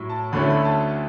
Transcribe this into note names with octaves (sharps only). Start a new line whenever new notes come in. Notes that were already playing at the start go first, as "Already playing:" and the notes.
Already playing: A2 F#3 E4
A5
D2 D3 A3 C#4 E4 B5
B5
A5